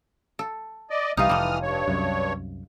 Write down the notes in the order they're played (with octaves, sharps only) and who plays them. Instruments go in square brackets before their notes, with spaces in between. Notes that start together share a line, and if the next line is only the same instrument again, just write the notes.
[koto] A4
[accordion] D5 D#5
[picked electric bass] C2 G3 [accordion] E3 D#6 F6 [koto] D#4 F4
[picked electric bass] F1 [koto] G3 A4
[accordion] G2 C#5
[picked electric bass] C2 F#2